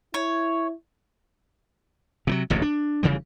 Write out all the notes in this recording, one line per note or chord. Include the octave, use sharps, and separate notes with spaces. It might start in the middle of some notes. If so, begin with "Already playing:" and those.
E4 C#5
C3 F3 F#3
D1 A1 G#2 C3
D4
F1 C#3 E3 G3